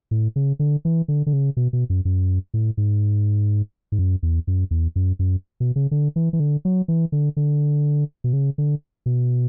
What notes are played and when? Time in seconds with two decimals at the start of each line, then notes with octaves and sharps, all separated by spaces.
0.11 A2
0.36 C#3
0.59 D3
0.85 E3
1.08 D3
1.26 D3
1.33 C#3
1.57 B2
1.73 B2
1.90 F#2
2.05 F#2
2.54 A2
2.77 G#2
3.92 G#2
3.99 F#2
4.23 E2
4.47 F#2
4.71 E2
4.96 F#2
5.19 F#2
5.60 B2
5.76 C#3
5.91 D3
6.16 E3
6.33 E3
6.40 D3
6.65 F#3
6.88 E3
7.12 D3
7.37 D3
8.24 B2
8.33 C#3
8.58 D3
9.06 B2